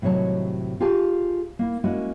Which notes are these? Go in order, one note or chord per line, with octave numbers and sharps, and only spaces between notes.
A2 C3 D#3 F#3 C#5 A5
F4 G4 G#4 G#5 A5
A#3 E4
G#3 A#3 C#4 E4 F#4